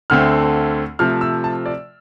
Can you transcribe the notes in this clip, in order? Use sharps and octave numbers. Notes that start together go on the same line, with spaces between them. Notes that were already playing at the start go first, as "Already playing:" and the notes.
D2 D3 A3 C4 F6
C3 F3 A3 F6
E6
A5
D5